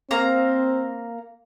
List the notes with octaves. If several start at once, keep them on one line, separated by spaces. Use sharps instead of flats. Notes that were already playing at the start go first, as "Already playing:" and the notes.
A#3 C4 F5 A#5